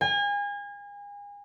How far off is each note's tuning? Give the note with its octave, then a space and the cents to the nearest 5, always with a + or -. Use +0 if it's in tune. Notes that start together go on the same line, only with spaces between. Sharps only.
G#5 -35